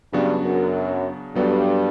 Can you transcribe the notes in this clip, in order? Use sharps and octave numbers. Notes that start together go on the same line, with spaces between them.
G2 C#3 F#3 B3 D4 F#4
F#2
G2 F#3 B3 F#4 A4